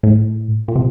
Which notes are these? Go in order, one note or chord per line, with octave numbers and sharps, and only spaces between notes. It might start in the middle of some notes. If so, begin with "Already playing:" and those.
A2
A#2
C3